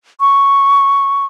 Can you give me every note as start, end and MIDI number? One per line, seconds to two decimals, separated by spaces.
0.20 1.26 85